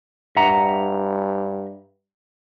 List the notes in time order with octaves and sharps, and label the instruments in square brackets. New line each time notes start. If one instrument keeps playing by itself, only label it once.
[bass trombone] G2 [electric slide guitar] E5 F#5 A#5